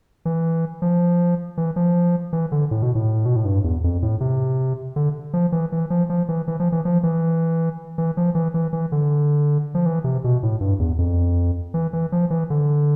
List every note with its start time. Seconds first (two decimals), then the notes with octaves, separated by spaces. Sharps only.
0.25 E3
0.82 F3
1.57 E3
1.76 F3
2.33 E3
2.52 D3
2.71 A2
2.82 B2
2.95 A2
3.26 B2
3.36 A2
3.45 G2
3.64 E2
3.84 F2
4.02 A2
4.20 C3
4.96 D3
5.33 F3
5.52 E3
5.72 E3
5.90 F3
6.10 F3
6.29 E3
6.48 E3
6.60 F3
6.72 E3
6.85 F3
7.03 E3
7.98 E3
8.17 F3
8.35 E3
8.54 E3
8.73 E3
8.92 D3
9.75 F3
9.86 E3
10.04 C3
10.24 B2
10.43 A2
10.61 G2
10.79 E2
10.98 F2
11.74 E3
11.93 E3
12.12 F3
12.30 E3
12.50 D3